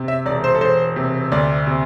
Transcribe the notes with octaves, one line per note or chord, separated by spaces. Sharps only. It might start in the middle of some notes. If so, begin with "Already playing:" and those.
Already playing: C3
E5
E1 D5
C5
A4
E1 C5
C3
D2 D5
C3